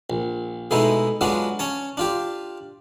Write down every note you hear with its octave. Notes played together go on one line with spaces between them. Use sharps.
A#1
B2 G#3 A3 B3 D#4 E4
F#3 G#3 B3 D4 F4 F#4
C#4 C#5 A5
D4 F4 G4